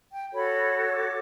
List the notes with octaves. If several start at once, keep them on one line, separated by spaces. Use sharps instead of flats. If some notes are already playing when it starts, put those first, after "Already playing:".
G5
F#4 A4 C#5 B5
E6
D6